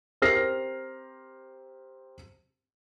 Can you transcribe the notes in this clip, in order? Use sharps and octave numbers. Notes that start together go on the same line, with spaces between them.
C4 G4 A#4 F6 A#6 C7